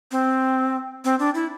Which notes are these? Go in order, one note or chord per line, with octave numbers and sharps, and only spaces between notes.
C4
C4
D4
E4